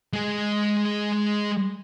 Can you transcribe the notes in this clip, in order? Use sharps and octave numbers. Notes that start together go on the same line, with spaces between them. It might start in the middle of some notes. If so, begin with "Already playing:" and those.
G#3 G#4